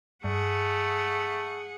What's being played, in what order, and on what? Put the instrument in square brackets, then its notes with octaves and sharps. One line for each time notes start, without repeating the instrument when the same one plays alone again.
[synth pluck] G2 [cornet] A3 [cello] G#4 F#5